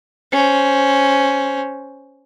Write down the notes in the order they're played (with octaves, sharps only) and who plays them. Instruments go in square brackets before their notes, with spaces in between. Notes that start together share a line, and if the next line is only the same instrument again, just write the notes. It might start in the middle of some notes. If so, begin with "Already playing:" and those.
[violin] C#4 C5